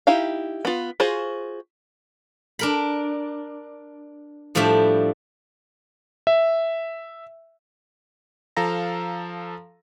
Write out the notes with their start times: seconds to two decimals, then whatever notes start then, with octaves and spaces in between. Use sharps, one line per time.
0.07 D#4 E4 G4 F5
0.65 B3 F4
1.00 F4 F#4 G#4 C5
2.59 D4 A#4 B5
4.55 A2 F3 G3 D4 E5
6.27 E5
8.57 F3 A4 F5 A#5 A#6